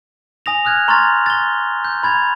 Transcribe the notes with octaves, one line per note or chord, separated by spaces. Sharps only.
G#5 D#6 A#6 F7
D#6 F6 F#6 G#6
A#5 C6 C#6 F6 G#6 A6
A6 G7
G6
B5 G#6 A6 F7